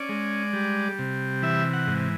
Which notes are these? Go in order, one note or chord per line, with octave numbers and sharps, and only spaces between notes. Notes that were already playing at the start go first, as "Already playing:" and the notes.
Already playing: C#4 D5
G#3
G3
C3
E3 E5
F#5
G#2